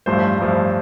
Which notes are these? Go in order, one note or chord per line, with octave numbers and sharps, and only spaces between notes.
A1 G2 F3 A3 C5
A1 G2 F3 A3